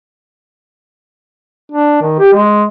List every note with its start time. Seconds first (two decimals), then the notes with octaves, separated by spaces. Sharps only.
1.72 D4
2.01 D#3
2.19 G4
2.33 G#3